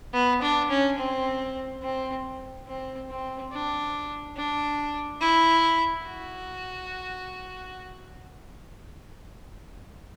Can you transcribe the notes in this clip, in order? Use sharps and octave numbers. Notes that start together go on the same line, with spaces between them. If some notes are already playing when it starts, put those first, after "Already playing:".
B3
D4
C#4
C4
C4
C4
C4
D4
D4
E4
F#4